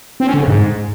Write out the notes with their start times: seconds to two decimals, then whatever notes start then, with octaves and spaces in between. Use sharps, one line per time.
0.20 C4
0.27 C#4
0.34 D3
0.41 C#3
0.48 G#2